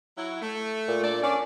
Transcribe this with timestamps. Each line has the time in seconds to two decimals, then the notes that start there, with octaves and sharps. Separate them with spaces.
0.17 F#3 E4
0.42 A3
0.88 A#2
1.04 D4 A4 D5
1.23 D3 C#4 D5